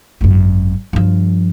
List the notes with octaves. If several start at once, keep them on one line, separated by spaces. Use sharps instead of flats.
G#1 F#2
G2 F3